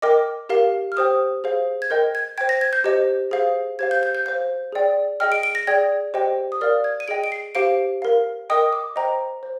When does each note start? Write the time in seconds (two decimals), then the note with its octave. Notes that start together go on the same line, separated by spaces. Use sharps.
0.02 A#4 D#5 G5 D6
0.49 G4 A#4 F5
0.92 F6
0.96 G4 C5 G5 D#6
1.44 G#4 C5 F5
1.82 G#6
1.90 A#4 D#5 G5 G6
2.15 G#6
2.38 C5 G5 G#6
2.49 A#6
2.61 G#6
2.73 G6
2.84 G4 C5 D#5
3.31 G#4 C5 F5
3.79 G4 C5 F5 G#6
3.91 G6
4.03 G6
4.15 G6
4.26 C5 F5 G6
4.72 G#4 D5 G5
5.20 G#4 D#5 G5 F6
5.32 D7
5.43 D7
5.55 A#6
5.67 G#4 D5 G5 G#6
6.14 G4 C5 D#5 G5
6.52 D#6
6.61 A#4 D5 F5 F6
6.84 G#6
7.00 D#7
7.08 G#4 D#5 G5 D7
7.24 D7
7.32 C7
7.55 G4 C5 F5 D7
8.02 A#4 F5
8.50 A#4 D#5 G5 D#6
8.73 D6
8.96 C5 D#5 G5 A#5
9.43 C5